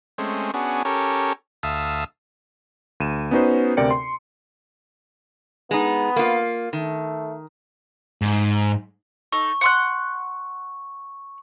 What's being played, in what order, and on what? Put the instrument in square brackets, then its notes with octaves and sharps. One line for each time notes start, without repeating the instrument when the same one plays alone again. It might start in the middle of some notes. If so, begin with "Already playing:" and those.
[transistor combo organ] G#3 A3 C4 C#4
B3 C#4 D4 F#4 G#4
C#4 G4 A4 A#4 C#5
D2 E5 F5 A5 D#6 E6
[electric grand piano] D2 D#7 E7
B3 C#4 D#4 F#4 B4 C5
D2 C3 A#4 D5 G5 C#7
C6
[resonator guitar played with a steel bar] G#3 D#4 [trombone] B3
[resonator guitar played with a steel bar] A#3 F4
[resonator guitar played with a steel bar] D#3 [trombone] A3
[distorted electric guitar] G#2
[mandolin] D#4 A4 [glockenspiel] C#6
[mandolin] F#5 C6 F#6